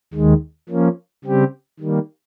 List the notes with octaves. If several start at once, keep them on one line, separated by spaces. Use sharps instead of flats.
D#2 D#3 G#3
F3 A#3 C#4
C#3 G3 C4 G4
D#3 G3 A#3